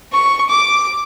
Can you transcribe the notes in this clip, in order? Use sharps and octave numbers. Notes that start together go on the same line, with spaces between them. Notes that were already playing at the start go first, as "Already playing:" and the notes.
C#6
D6